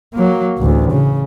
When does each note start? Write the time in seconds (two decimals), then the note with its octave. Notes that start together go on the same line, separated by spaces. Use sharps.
0.14 F#3 A#3
0.58 A1 D2
0.91 C#3